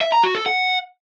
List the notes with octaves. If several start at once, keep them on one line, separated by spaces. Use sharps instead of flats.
E5
A#5
F#4
A4
F#5